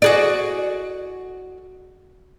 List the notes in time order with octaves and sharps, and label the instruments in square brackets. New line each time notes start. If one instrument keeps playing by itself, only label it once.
[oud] F#4 G#4 D5